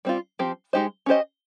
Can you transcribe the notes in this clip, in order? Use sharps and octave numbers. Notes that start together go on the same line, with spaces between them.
G3 C4 F4
F3 C4 G4
G#3 D#4 G4 C5 D#5
C#4 G4 C5 D#5